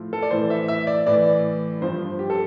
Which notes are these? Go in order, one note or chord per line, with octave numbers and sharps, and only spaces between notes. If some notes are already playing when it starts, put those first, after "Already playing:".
Already playing: A2 F3
A4
D5
A2 E3 C5
E5
E5
D5
A2 E3 D5
G2 F3 C5
G4
A4